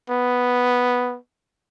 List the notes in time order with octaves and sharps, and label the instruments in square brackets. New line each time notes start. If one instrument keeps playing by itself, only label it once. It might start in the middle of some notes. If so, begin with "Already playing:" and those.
[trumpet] B3